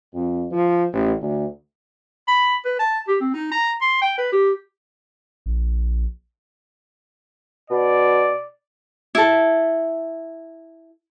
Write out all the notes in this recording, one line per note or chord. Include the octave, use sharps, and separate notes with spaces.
F2
F3
A1
D2
B5
B4
A5
G4
C4
D#4
A#5
C6
G5
B4
G4
A#1
B2 D5
E4 A4